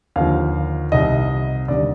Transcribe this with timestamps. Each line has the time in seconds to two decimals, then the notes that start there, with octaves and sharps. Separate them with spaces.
0.16 D#2 D3 F3 F5
0.92 C2 C3 D#3 D#5
1.68 D#2 D3 G3 D5